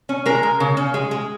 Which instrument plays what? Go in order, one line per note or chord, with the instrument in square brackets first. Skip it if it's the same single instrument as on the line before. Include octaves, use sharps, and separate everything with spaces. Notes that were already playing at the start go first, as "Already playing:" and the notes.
[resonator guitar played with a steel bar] C#4
G#3 A#4
G#3
C#3
C#4
G#3
G#3